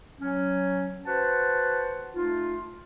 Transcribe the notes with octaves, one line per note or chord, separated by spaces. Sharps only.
F#3 C#4
F#4 B4 C5 F#5 A5
A3 D#4 F4